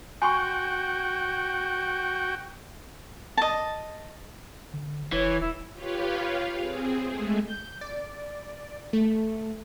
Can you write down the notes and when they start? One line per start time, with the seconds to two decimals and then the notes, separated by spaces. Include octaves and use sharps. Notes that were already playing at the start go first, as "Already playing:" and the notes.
0.22 F#4 G5 G#5 C6 C#6
3.37 D#5 A5
4.74 D3
5.12 F1 E3 C#5
5.41 E1 E4
5.73 F4 G4 B4 C#5 F5
6.58 C4 G#4
7.03 G#3 A3
7.48 G6
7.81 D5
8.93 A3